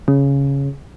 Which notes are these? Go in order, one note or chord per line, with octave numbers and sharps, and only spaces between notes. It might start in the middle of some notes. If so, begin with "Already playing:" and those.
C#3